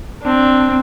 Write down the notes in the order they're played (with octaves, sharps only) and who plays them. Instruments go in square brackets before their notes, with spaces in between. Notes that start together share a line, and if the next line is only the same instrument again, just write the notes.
[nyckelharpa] C4 D4